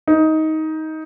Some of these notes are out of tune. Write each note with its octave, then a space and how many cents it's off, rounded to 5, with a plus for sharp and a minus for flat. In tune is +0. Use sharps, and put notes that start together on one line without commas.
D#4 +15